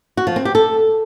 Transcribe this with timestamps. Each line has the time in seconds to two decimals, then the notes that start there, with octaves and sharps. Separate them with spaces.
0.17 F#4
0.27 F3
0.36 C4
0.45 G4
0.55 A4